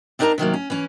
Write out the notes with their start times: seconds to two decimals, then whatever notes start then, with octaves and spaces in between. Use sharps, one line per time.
0.19 C4 D4 D#4 A#4 A5 A#5
0.38 C3 D#3 F#3 A#3
0.54 C#4
0.70 E3 C#4